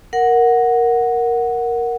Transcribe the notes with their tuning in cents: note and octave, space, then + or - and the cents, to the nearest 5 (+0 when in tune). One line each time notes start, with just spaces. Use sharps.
A#4 +0 F#5 -5